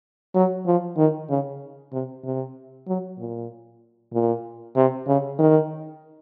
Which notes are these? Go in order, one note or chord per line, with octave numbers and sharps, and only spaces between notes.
F#3
F3
D#3
C#3
C3
C3
F#3
A#2
A#2
C3
C#3
D#3